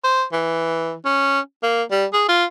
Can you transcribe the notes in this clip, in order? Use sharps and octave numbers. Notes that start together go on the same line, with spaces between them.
C5
E3
C#4
A#3
G3
G#4
F4